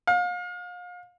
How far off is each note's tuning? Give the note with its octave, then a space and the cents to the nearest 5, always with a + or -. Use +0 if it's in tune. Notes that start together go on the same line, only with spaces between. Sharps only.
F5 +35